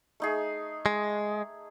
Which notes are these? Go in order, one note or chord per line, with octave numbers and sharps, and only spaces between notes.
A3 D#4 G#4
G#3